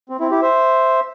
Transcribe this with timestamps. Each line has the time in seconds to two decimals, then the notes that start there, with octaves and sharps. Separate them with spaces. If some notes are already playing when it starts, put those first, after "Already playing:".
0.09 C4
0.20 C4 E4
0.31 E4 G4
0.42 C5 E5